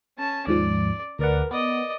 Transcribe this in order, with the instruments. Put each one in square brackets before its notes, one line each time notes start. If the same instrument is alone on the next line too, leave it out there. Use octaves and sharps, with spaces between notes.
[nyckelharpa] C#4 A5
[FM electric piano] D#2 G#2 F3 [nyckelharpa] D5
[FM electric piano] D2 D5 F#5 [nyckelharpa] A#4 B4
[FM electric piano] B3 [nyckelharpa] D5 D#5